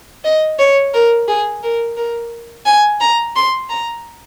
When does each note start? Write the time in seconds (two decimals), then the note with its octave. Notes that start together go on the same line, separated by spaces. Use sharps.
0.24 D#5
0.59 C#5
0.94 A#4
1.28 G#4
1.63 A#4
1.97 A#4
2.66 G#5
3.01 A#5
3.36 C6
3.69 A#5